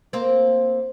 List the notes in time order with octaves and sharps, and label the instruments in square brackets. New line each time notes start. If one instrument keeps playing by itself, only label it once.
[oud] A#3 C4